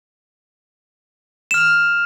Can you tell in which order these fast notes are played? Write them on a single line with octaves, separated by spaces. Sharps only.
E7 F6 F7